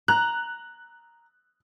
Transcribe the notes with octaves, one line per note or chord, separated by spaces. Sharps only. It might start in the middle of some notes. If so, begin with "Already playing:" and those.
A#5 F#6